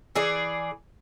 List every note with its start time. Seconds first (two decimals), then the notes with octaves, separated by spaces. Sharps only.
0.16 E3 G#4 D5